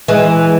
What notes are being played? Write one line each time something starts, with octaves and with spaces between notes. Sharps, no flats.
E3 G#3